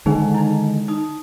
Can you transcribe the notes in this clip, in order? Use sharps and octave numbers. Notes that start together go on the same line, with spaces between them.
D3 D#3 G#3 D#4 G#4 C5
D#4 E4
D#4 D#6